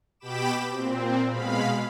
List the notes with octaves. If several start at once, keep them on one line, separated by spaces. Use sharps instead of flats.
B2 G4 G5 B5 D6 E7
A#2 C4
B2 G#3 F5 B5